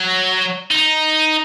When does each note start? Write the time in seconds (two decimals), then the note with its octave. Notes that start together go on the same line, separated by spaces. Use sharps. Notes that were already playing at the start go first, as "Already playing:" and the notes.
Already playing: F#3
0.71 D#4